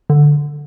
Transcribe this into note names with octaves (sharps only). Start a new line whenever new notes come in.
D3